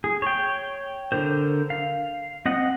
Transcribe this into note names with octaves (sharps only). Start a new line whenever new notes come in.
G#4
C#5 G5
D3 A#4 C5
F5
C4 D#5 F#5